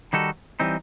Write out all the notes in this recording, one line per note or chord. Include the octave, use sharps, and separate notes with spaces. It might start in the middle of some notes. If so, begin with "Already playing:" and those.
D#3 G3 D#4 F#4 A4
E3 G3 C4 D#4